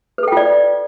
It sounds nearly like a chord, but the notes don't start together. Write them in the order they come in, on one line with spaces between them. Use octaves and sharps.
B4 A4 G5 F4 D5